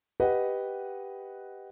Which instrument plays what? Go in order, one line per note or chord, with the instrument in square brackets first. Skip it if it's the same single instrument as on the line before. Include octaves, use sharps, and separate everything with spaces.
[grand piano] G4 B4 D#5 F#5